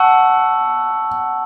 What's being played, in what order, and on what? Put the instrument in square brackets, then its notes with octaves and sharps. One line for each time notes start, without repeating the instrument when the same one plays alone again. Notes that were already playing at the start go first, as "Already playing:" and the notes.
Already playing: [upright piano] F#5 [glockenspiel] A5 C#6 E6